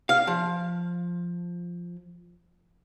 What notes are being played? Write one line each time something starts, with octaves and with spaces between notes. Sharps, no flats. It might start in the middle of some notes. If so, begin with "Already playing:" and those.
F5
F3